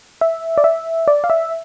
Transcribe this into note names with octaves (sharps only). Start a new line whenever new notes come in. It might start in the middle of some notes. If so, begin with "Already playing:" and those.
E5
D5
E5
D5
F5
E5